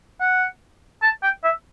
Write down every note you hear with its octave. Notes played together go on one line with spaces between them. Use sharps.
F#5
A5
G5
E5